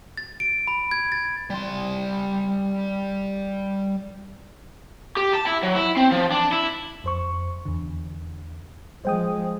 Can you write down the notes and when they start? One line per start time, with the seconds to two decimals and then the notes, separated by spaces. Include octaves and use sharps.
0.17 A6
0.40 D7
0.67 B5
0.91 G#6
1.12 A6
1.50 G3 C6
5.17 G4
5.34 A5
5.47 E4
5.63 F#3
5.75 E4
5.97 C4
6.12 F3
6.32 D4
6.53 E4
7.04 F2 C5 C#6
7.65 E2 D3
9.05 F3 G#3 C5 G5 D#6